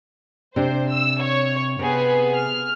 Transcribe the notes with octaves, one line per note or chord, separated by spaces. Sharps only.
C3 D4 C5
E6
C#5
C3 B3 G#4 B4
F6